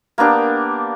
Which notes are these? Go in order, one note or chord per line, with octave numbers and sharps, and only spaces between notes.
A#3 B3 D4 G4